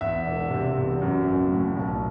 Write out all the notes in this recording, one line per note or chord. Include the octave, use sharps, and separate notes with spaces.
E2 E5
E1
C3
E2
F#2
F#1
A2
B1